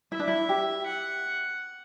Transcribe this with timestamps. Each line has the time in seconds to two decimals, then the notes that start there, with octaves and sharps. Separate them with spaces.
0.12 E4 E5
0.20 D4
0.28 E4
0.49 G4
0.87 F#5